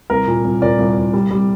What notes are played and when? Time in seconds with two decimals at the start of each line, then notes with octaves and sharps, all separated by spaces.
0.10 C2 A#4
0.28 A#2
0.44 C2
0.62 A#2 A#4 D5
0.79 C2
0.96 C2
1.14 G3
1.31 G3